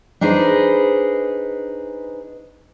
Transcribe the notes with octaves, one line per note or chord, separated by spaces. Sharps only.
D4 D#4 G#4 B4 C5